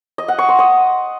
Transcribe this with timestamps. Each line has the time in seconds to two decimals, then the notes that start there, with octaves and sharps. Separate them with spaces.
0.18 D#5
0.28 F#5
0.39 C#6
0.49 C6
0.59 D#6